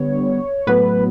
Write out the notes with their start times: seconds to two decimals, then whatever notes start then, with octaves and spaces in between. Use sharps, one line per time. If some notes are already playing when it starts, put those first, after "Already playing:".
Already playing: D3 G3 B3 C#5
0.67 A2 F#3 B3 B4